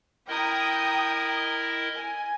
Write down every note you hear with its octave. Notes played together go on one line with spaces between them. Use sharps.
E4 A#4 D#5 G5 A#5 D#6
G#5